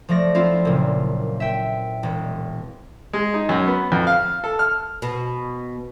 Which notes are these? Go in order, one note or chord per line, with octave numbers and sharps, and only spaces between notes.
F3 A3 D5 A#6
C4 E4 F4
F#1 A#2
E5 G5
E1
G#3
D#4
F#2
B3
F2
F5
A4
F6
B2